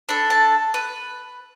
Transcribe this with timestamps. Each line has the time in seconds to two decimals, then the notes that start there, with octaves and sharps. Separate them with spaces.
0.09 D4 A4 B5
0.30 A5
0.74 B4